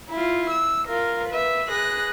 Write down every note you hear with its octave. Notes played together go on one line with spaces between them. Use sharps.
E4 F4
E6
F4 A#4
B4 E5
G#4 B4 F#6 A#6